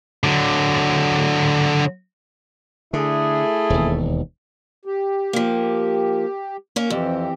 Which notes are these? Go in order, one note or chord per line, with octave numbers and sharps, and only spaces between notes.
D3 F#3
D3 A3 E4 G#4
E1 D#2
G4
F3 A#3
A#3 C#4
F2 E3 C4 G4